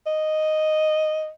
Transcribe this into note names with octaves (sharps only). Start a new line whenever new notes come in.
D#5